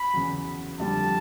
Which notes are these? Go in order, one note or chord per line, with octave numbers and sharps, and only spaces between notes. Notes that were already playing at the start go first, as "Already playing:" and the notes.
Already playing: B5
E2 C#3 F#3
F2 D3 G3 A5